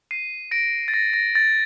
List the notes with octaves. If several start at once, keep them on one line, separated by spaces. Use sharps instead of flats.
C7 D#7
A#6 D7
A6
A#6
A#6
A6